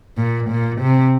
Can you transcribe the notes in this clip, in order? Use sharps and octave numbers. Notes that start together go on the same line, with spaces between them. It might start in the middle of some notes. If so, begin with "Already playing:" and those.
A#2
A#2
C3